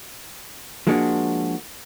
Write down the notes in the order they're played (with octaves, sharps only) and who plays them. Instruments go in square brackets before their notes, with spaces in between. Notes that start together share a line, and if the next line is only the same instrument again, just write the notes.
[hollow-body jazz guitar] F3 G#3 A#3 D4 F#4